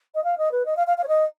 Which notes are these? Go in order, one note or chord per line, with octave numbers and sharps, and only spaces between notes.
D#5
F5
D#5
B4
D#5
F5
F5
F5
C#5
D#5